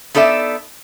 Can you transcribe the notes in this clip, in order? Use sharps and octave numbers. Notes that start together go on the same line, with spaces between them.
B3 D#4 A4 D5 E5